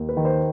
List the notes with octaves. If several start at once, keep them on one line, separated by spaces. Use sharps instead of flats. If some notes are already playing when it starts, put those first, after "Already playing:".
Already playing: D#2
B4
D#3
C5